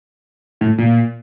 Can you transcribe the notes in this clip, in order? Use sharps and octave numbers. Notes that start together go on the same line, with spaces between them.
A2
A#2